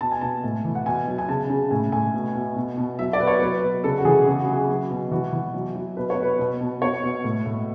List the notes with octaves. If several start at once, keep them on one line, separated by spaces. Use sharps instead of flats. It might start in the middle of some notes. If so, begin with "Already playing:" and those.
B2 A5
G#5
B2 A5
A2
E3
F#5
B2 G#5
F#3
G#5
C#3 A5
C#3
A2 G#5
A2 G#5
B2
B2
B2
B2
F#3 E5
D5
B2 B4
C#5
F#3 B4
B2
C#3 A4
F#4
E3 G#4
C#3 G#4
F#4
F#3 G#4
F#3
B2
E3 F#4
E3
F#3
F#3
B2 B4
C#5
B2 B4
B2
B2
B2 C#5
B2
A2
A2